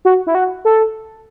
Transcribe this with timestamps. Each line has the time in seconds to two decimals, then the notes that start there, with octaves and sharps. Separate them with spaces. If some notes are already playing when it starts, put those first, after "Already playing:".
0.05 F#4
0.27 E4
0.35 F#4
0.65 A4